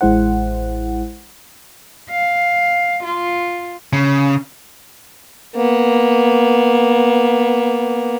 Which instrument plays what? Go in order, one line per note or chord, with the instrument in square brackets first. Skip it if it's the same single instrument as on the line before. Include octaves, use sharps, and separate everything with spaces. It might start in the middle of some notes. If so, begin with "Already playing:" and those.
[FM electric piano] A1 G#3 E4 C5 F#5
[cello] F5
F4
[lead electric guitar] C#3
[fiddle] A#3 B3